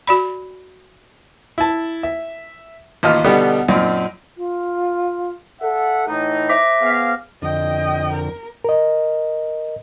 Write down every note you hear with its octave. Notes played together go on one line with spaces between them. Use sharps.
F#4 D5 B5
E4 A5
E5
A1 D#2 F4 D#5 F6
B2 D3 G3 B3 D#4 G4
F#2 A#2 C4 D#4
F4
A4 E5 F#5
A2 E3 D#4
C5 E5 D6 A#6
B3 G#4 F5
F2 D3 D#5 G5
A#4
A#4 D#5